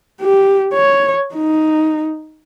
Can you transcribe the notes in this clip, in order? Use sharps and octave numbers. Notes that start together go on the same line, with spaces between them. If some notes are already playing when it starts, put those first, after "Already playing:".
G4
C#5
D#4